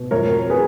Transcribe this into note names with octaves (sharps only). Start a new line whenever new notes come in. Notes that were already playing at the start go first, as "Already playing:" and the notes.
Already playing: B2
F2 A#4 C#5
G#4 B4